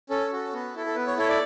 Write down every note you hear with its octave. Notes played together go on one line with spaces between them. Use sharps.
C#4 A4
F#4 A4
B3
E4 A4
A4
B3 B4
C#5
E4 A4 C#5
D5